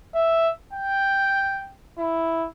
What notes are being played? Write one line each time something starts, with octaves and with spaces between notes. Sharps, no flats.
E5
G5
E4